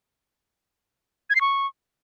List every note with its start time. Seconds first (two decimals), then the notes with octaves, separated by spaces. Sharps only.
1.30 G#6
1.35 C7
1.41 C#6